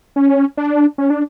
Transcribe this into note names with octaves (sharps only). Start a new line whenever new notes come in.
C#4
D4
C#4
D4